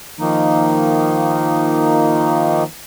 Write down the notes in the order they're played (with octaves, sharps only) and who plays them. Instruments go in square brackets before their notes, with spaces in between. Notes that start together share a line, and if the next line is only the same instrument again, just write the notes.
[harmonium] D#3 F3 A#3 D#4